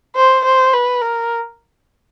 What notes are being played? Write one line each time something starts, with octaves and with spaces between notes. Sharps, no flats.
C5
C5
B4
A#4